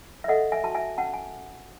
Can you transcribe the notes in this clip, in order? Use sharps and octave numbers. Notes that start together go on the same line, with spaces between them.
E5
A4 D#5 F#5
E5 G#5
F#4 A5
E5 G#5
C#4 F#5 A5
G#5